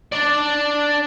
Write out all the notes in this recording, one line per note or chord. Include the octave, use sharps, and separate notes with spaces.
D4 D5